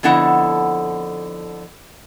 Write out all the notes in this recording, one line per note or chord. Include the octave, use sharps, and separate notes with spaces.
F2 D3 B3 E4 F#5